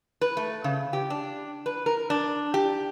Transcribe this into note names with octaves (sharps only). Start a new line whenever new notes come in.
B4
A3
C#3
G4
D4
B4
A#4
D4
G4